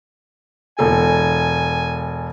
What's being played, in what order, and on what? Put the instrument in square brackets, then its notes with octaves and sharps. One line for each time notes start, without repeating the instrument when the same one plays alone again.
[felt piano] E1 A4 [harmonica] G#5